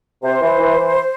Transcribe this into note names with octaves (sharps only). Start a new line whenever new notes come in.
C3 C5
E3
E3
E3